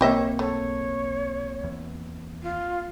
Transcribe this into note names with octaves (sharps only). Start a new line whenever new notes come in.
B1 A#3 C4 G4 C#5 D#5 E5
A3 C#5
E2
F4